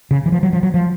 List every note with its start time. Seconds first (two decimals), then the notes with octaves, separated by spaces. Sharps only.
0.11 C#3
0.26 E3
0.32 F3
0.43 F#3
0.53 F3
0.63 F#3
0.74 F3